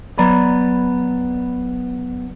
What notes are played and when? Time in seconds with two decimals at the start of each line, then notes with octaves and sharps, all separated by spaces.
0.18 F#3 B3 D5 A#5 B5